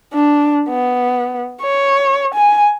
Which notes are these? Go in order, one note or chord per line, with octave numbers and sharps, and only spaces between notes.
D4
B3
C#5
G#5